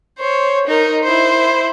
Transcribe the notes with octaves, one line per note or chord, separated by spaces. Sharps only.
C5 C#5
D#4 A#4
E4 C5